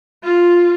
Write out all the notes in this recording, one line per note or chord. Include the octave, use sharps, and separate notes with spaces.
F4